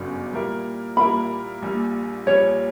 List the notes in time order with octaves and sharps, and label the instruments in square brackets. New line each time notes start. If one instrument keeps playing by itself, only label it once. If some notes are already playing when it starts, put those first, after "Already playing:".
Already playing: [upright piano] G1 F#2 C#3 F#3
A#2 G3 A#3 E4 A#4
[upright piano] A#2 G3 A#3 E4 A#4 [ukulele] B5
[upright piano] A#1 A#2 G3
[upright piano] A#1 A#2 G3 [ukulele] C#5